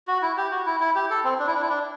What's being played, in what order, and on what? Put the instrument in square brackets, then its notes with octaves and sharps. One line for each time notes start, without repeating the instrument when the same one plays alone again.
[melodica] F#4
E4
G4
F#4
E4
E4
G4
A4
C4
D4
E4
D4
E4
D4